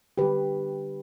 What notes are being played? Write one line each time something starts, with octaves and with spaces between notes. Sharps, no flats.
D3 G3 G4 B4